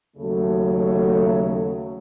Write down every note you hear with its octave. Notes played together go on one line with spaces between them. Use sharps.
D#2 C#3 F#3 A3